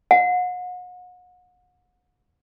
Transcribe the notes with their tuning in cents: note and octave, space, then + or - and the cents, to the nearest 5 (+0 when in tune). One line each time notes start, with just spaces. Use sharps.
F#5 -35